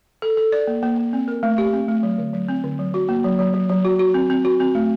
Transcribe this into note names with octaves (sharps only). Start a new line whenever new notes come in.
A4
A4
D5
A#3
A#3
A#3
C4
A#4
A3
G4
C4
A3
F#3
D3
F#3
C4
D3
F#3
F#4
A#3
F#3
F#3
F#3
F#3
F#4
F#4
C4
C4
F#4
C4
A3